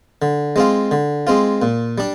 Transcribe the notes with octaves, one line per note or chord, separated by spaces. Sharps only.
D3
G#3 C4 F4
D3
G#3 C4 F4
A#2
G3 D4